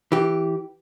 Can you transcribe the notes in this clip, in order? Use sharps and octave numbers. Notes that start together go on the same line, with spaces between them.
E3 G4